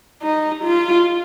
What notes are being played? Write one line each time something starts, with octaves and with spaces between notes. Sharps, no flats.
D#4
F4